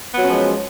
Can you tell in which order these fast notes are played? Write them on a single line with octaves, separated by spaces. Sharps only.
B3 F#3 C#4 F3 G#3